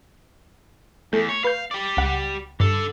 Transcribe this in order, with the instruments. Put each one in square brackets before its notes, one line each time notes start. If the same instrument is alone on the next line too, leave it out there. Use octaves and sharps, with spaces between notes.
[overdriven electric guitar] E2 [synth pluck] A3 G6
[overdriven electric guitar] C#5
[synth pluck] B4 G6 [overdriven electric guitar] F5
[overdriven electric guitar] G4 D5
[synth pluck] C#2 F#5
[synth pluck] G2 [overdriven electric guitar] D3 A4